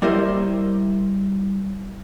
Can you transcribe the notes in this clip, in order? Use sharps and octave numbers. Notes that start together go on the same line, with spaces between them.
G3 E4 A#4 C5 D#5 E5